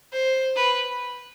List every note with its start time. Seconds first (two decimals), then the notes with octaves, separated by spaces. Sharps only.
0.12 C5
0.56 B4